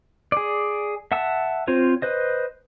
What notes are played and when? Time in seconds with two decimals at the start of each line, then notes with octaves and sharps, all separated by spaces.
0.32 G#4 D5
1.12 E5 F#5 A5 E6
1.68 C4 F4 C5 C#5
2.02 B4 C5 D#5